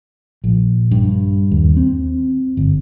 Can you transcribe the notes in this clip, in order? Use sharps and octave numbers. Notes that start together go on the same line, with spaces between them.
A#1
G2
D#2
C4
G1